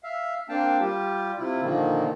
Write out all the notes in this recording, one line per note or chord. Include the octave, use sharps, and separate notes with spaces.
E5 F5
A#3 C4 D4 F5 G5 A5
G3 F4 G4
C3 E4 F4
A#2 D3 D#3 F3 A#3